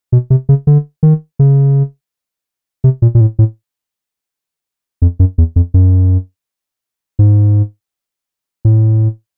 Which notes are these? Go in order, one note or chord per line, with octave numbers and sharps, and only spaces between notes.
B2
C3
C#3
D3
D#3
C#3
C3
A#2
A#2
A2
A2
F2
F#2
E2
F2
F#2
G#2
A2